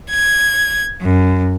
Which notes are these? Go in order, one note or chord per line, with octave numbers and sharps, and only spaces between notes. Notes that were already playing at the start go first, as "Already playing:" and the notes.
G#6
F#2